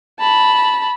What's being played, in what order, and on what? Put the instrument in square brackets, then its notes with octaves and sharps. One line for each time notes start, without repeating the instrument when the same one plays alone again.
[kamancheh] A5 B5